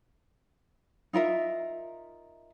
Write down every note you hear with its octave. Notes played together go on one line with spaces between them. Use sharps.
D#4 F4 A#4 E5